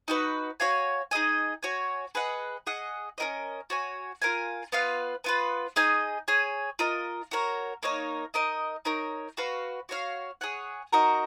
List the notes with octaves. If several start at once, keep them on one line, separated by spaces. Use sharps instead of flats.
D#4 F#4 B4
F#4 C#5 F5 G#5
D#4 G#4 D#5 G#5
F#4 C#5 G#5
G#4 B4 D#5 F#5
G#4 D#5 F#5
C#4 F4 A#4 D#5
F#4 C#5 G#5
F4 A#4 F5 G#5
B3 F4 B4 F5
B3 F4 B4
D#4 G#4 D#5 G#5
G#4 C#5 G#5
F4 A#4 D#5
F#4 A#4 C#5
A#3 D#4 A#4 C#5
D#4 A#4 D#5
D#4 A#4 C#5
F#4 B4 F5
F#4 C#5 F5
G#4 C#5 F#5
D#4 F#4 A#4 D#5